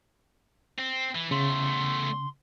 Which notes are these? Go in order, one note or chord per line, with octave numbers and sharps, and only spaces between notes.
C4
E3
E2 C#3 A3 C6